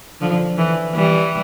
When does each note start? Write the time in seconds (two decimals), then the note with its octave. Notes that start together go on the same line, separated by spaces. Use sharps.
0.21 D3 F3
0.57 E3
0.95 E3 G3